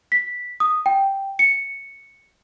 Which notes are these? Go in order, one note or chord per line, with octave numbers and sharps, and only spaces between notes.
B6
D#6
G5
C#7